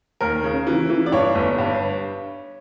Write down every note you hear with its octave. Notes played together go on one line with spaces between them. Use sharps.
D#2 A#4
C#3
E3
E3
D5
G2 C#5
G1
G2